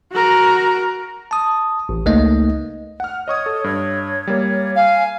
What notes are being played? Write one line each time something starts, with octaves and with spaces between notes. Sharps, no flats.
F#4 A#4
A5 D#6
A1
C#2 A3 A#3 D#4 D#5
F#5 F6
C#5 D#5 C#6 D#6
A4
G2 C#5
G3 A#3
F5 G#5